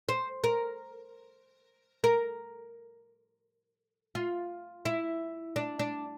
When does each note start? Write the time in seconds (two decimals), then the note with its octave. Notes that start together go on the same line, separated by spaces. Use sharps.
0.09 C5
0.44 A#4
2.04 A#4
4.15 F4
4.85 E4
5.56 D4
5.79 D4